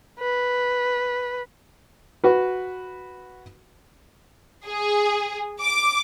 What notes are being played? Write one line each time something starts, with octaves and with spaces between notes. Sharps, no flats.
B4
F#4 B4
G#4
D6